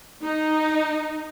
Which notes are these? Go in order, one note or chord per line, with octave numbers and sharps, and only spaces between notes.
D#4